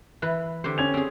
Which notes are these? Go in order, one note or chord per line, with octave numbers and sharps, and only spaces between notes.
E3 B4
D3 G4 C5
C#4 G#6 F7
C4 G#4